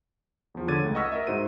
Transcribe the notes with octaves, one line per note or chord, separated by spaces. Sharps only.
E2 F3
D3 C#5 D6 G#6 A6 D#7
C#2 A3
D#5 F#5 C#6 E6 F6 B6
A#4 D#5 E5
G#2 D#4 F#4 C5 D#7